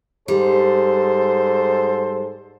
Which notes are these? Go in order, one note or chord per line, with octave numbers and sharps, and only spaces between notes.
G#2 G3 A4 C5